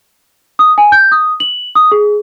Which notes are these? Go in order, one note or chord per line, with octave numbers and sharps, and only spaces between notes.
D#6
G#5
G6
D#6
F#7
D#6
G#4